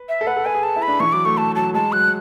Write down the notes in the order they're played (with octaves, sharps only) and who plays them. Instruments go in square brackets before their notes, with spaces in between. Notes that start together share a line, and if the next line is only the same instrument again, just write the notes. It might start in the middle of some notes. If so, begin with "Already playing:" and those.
Already playing: [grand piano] B4
[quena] E5
[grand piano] A4
[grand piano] B4 [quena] F#5
[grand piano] A4
[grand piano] B4 [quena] G#5
[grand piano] G#4
[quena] A5
[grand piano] E4
[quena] B5
[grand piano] D4
[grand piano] E3 [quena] C#6
[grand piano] F#3 [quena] D6
[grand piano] A3 [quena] C#6
[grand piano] A3 [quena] A5
[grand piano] F#3 [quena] A5
[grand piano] G#3 [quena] A5
[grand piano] F#3 [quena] F#6